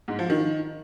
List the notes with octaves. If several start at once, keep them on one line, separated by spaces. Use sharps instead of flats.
G#2
F3
D#3